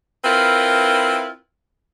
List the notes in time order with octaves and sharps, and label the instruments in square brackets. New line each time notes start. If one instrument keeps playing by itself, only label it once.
[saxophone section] C4 E4 F4 A#4 B4